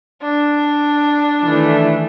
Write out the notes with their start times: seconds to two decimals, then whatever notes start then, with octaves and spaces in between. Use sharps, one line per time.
0.22 D4
1.44 D#3 E3 A3